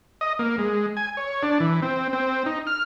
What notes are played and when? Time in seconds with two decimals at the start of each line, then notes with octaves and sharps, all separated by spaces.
0.21 D#5
0.39 A#3
0.58 G#3
0.97 G#5
1.17 C#5
1.43 D4
1.60 E3
1.82 C4
2.13 C4
2.46 D#4
2.67 F6